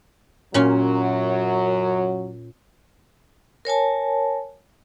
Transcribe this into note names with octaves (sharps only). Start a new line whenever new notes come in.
F#2 A#2 F#3 C#4
A#4 C#5 G#5 A5